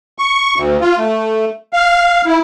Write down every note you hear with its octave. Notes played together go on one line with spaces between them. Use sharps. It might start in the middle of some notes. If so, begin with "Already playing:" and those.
C#6
D2
F4
A3
F5
E4